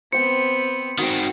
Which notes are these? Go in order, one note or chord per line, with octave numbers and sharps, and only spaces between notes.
B3 C4 C5 G5 C#7
D#3 C4 F#4